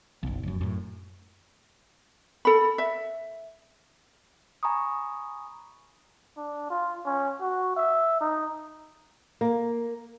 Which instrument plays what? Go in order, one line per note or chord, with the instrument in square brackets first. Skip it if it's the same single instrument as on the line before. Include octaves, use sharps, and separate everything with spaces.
[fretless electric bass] F#1 B1
F1 F#2
F#2 A2
[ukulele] A4 B5
E5
[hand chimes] G#5 A#5 B5 C#6 D#6
[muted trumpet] D4
F4
C#4
F#4
E5
D#4
[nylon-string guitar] A#3